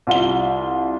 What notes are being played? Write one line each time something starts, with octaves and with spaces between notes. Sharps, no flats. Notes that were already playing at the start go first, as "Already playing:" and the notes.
C2 F4 F5 G7